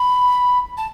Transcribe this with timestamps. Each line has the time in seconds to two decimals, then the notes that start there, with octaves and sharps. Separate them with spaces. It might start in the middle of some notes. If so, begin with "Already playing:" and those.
Already playing: B5
0.77 A5